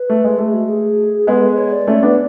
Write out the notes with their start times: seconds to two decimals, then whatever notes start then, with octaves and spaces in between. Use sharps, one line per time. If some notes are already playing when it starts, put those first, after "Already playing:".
Already playing: B4
0.10 A3
0.24 G#3
0.39 A3 G#4
0.53 F#4
0.68 G#4
1.27 G#3 B3 A4
1.43 B4
1.58 C#5
1.72 D5
1.87 A3 C#4
2.03 B3 D4